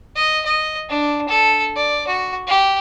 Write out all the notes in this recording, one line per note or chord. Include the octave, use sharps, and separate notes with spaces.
D#5
D#5
D4
A4
D5
F#4
G4